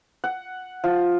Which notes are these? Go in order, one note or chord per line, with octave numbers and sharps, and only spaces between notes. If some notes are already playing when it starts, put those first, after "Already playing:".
F#5
F3